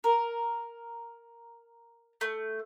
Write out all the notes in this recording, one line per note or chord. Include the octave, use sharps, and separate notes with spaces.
A#4
A3